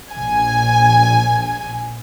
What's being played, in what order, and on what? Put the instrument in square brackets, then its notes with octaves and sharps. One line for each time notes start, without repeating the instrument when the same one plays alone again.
[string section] A#1 G#5